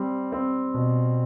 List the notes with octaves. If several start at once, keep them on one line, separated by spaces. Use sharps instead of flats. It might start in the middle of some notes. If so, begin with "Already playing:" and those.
Already playing: G3 C4
C4
B2